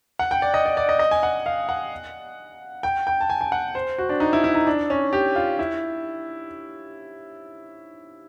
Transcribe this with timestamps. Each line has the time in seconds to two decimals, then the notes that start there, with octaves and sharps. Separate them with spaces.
0.19 F#5
0.31 G5
0.42 D5
0.54 D#5
0.66 D5
0.77 D5
0.89 D#5
0.99 D#5
1.11 G#5
1.23 F#5
1.46 F5
1.69 F#5
2.83 G5
3.07 G5
3.21 A5
3.30 G#5
3.41 G#5
3.52 F#5
3.75 C5
3.98 F#4
4.09 D4
4.20 D#4
4.33 E4
4.44 E4
4.55 D#4
4.67 D4
4.90 C#4
5.13 G4
5.36 F4
5.59 E4